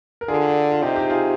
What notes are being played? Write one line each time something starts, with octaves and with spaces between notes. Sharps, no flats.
A#4
D3 F4 G#4
F4
C3 D#4 G4
D#4 G4
F4 G#4